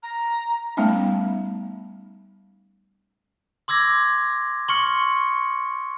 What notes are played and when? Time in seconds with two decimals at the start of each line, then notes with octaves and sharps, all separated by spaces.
0.03 A#5
0.77 G3 A3 B3 C#4 D#4
3.68 C6 D6 E6 G#6 A#6
4.69 C6 C#6 F6 C#7